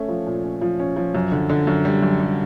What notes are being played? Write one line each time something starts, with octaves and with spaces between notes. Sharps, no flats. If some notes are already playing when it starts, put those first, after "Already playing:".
Already playing: A3 C#4
F3
A#2
C#4
F3
C#4
F3
F#2
D3
D3
F#2
G3
F#2
G3